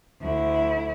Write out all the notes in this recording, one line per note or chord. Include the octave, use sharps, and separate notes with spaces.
D2 E4